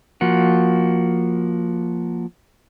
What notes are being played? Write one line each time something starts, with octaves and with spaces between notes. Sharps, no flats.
F3 A#3 F#4